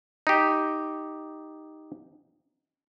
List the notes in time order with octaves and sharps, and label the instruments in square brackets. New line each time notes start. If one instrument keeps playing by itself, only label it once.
[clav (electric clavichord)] D#4 G4